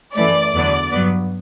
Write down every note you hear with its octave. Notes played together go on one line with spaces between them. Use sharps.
F#2 E3 A3 D5
E2 D3 F#3 B3
G2 F#3 B3